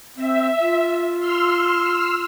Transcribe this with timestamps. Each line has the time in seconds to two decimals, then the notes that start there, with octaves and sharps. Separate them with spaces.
0.16 C4 E5
0.60 F4
1.19 C6 E6 F6